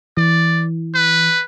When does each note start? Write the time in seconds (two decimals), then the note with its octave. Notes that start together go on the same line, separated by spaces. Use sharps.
0.17 E3 D5
0.95 B4